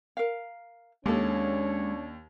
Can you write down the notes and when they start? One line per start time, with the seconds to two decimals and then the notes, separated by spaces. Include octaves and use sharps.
0.17 A#4 F5
1.06 D#2 G#3 C#4 D4 G4 A4 C#5